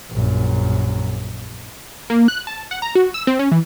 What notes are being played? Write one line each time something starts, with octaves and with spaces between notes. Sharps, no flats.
A#1 F#2
A#3
F#6
A5
F#5
A#5
F#4
E6
C4
C#4
E3